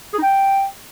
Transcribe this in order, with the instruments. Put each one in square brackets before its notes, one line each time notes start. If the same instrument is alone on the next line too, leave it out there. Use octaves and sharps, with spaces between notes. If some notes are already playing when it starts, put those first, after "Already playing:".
[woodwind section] G#4
D#4
G5